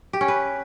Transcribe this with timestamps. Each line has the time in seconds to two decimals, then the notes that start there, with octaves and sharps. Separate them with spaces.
0.13 G4
0.21 C#4
0.28 B4